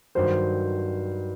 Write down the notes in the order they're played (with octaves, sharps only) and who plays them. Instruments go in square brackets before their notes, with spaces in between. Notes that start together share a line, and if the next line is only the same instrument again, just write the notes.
[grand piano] G2 D#3 F#3 C5